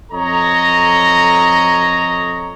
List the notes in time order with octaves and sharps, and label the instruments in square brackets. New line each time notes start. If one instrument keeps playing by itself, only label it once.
[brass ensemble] F2 A4 C#5 D#5 A#5